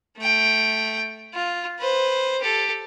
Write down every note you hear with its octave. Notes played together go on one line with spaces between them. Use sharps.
A3 G5
F4
B4 C5
G4 A4